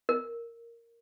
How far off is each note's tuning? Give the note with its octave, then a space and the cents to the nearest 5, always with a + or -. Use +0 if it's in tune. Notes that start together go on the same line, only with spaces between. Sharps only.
A#4 -5